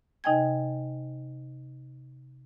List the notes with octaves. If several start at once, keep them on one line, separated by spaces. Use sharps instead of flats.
C3 D#4 D#5 G5 G#5 G#6